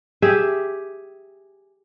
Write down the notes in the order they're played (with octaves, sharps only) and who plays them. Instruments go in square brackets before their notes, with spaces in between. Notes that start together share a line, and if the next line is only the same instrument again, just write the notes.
[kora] G4 G#4 E5